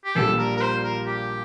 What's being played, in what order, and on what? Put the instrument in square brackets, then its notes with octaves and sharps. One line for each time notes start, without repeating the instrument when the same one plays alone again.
[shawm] G4
[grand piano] A#1 A#2 G3 [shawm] A4
[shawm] A#4
A#4
C5
A#4
G4